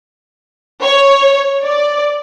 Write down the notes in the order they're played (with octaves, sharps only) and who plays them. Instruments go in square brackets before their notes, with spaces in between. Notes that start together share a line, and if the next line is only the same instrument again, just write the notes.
[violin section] C#5
D5